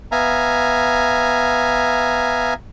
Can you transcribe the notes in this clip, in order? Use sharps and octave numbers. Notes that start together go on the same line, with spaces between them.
B3 E5 F5 G#5 A#5